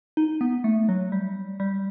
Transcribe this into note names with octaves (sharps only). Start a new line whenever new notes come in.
D#4
B3
A3
F#3
G3
G3